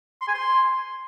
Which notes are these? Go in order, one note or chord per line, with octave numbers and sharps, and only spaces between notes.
C6
G#5
C6